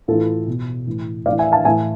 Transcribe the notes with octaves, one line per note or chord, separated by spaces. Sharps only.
A2 E3 F4 A4
B2
A2 E3
A2 E3 D5 F5
E5 G#5
F5 A5
A2 E3 E5 G#5